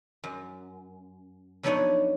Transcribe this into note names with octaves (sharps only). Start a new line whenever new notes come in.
F#2
F2 F#3 B3 D4 D#4 C#5